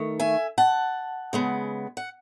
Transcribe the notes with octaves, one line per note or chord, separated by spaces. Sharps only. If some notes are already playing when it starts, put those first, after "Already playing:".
Already playing: D#3 A3
E5 G#5
F#5 A5
C#3 G#3 B3
F#5